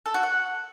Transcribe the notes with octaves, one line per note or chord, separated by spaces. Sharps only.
A4
F#4
F#5